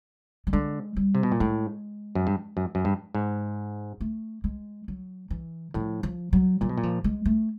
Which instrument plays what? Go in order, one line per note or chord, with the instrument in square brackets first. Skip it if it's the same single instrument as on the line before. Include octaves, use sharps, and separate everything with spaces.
[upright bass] G3
[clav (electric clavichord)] D3 [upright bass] G#3
[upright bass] G3
[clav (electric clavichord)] C3
B2
A#2
[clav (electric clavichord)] A2 [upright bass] G#3
[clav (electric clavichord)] F#2
G2
F#2
F#2
G2
G#2
[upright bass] A3
G#3
F#3
E3
[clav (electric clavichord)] A2 [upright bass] F3
[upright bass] F3
F#3
[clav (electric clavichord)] A#2 [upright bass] F#3
[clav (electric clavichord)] B2
A#2
[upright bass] F3
G#3
A3